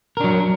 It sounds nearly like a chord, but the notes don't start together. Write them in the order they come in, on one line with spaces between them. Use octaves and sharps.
A#4 D4 F#3